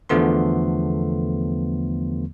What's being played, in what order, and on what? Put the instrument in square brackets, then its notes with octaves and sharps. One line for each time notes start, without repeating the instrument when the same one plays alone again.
[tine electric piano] E2 D3 F3 A3 B3 C6